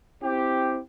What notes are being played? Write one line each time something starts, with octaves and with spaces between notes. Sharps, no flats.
C4 E4 G4